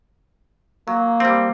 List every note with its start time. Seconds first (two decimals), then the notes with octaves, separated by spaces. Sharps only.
0.88 F#3 A#3
1.20 G3 C4